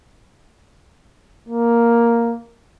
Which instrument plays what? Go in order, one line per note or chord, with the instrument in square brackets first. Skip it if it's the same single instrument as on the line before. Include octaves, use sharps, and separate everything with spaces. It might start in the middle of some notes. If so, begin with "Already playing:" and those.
[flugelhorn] A#3